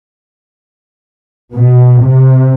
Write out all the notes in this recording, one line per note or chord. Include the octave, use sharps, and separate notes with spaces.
B2
C3